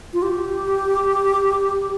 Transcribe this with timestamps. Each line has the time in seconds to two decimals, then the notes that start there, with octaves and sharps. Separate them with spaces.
0.13 F4
0.22 G4